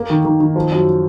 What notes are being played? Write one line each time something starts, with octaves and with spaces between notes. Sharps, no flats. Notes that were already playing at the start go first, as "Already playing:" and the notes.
Already playing: A#3
D#3
D#3
D#3
F3
F#2